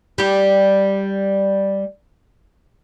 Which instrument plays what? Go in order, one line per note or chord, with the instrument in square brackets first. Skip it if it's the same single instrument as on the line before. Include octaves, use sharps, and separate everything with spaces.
[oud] G3 G4